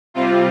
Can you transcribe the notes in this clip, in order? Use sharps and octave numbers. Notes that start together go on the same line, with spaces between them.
C3 G3 C4 F4